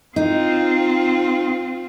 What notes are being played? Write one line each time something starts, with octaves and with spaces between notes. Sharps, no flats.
C4 D#4 F4